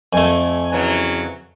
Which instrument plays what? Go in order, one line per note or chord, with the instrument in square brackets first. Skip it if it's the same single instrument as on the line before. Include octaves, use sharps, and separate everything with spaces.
[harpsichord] F2 A3 [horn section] G#5
[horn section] C#3 E3 F#3